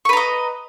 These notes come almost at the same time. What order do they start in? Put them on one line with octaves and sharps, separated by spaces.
C#6 B4 A#5 D#5